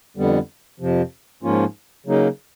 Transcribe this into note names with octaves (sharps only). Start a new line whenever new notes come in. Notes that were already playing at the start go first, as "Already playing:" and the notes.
F2 D3 G3 B3
F2 C3 F3
G#2 F3 A#3 C#4 F4
C#3 F#3 A#3 D#4